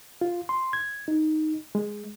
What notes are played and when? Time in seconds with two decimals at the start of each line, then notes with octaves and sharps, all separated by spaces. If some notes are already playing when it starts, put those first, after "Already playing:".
0.21 F4
0.49 C6
0.73 G#6
1.08 D#4
1.75 G#3